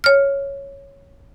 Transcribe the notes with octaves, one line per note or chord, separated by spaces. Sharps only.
C#5 F6